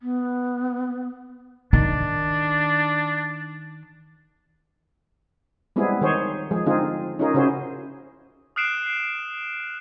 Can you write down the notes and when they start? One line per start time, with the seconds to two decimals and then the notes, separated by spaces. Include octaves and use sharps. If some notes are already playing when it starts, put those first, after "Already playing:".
0.01 B3
1.73 D#3 D4
5.76 G3 G#3 B3 C4 E4 G#4
6.01 D#3 G#4 C5 C#5
6.51 F3 G#3 G#4
6.66 D3 C4 D#4 F4 G#4
7.19 C#4 D#4 F4 G#4 A#4
7.34 C#3 C#4 E4 F#4 G#4 C5
8.56 D#6 F6 F#6 C7 D7 E7